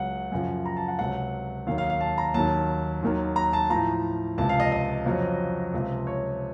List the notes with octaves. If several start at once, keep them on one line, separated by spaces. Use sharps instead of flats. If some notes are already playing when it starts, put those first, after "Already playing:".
Already playing: C#2 C#3 F#3 F#5
F#2 C#3 F3
A#5
A5
F#5
C#2 C3 F#3 F#5
D#2 D#3 F#3 F5
F5
F5
A5
A#5
D#2 D#3 F#3 A5
D#2 D#3 F#3
A#5
A5
A2 F3 A#5
C#2 C3 F3 A5
F5
D#5
D#5
F2 C#3 F#3
C#2 C3 F3
C#5